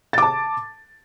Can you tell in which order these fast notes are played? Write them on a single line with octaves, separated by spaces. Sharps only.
A6 D6 A5